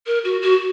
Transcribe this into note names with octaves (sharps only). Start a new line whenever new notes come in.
A#4
F#4
F#4